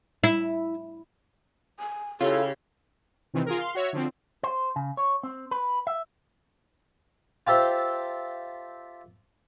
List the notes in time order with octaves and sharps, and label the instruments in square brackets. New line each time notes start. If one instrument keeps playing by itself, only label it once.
[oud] E4
[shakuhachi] G#5
[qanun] C#3 [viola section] E4 G4 C#5 [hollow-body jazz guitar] F4 [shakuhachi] A4
[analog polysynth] C3 D#3 E3 C4
F4 G#4 A#4
F5 C6
F#4 C#5 E5
D3 F3 C4
[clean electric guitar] C5
C#3
C#5
C4
B4
E5
[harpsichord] F4 G4 A4 C5 E5